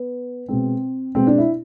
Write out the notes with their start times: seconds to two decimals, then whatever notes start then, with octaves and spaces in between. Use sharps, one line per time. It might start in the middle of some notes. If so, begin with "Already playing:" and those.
Already playing: B3
0.48 B2 G#3 C4
1.15 B2 G#3 C4
1.27 D4
1.38 E4